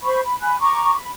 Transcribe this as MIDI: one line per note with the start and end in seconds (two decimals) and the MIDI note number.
0.04 0.21 72
0.04 0.21 83
0.04 0.21 85
0.23 0.38 83
0.40 0.57 80
0.40 0.57 83
0.40 0.57 90
0.60 0.95 82
0.60 0.95 85
0.60 0.95 86
0.96 1.09 83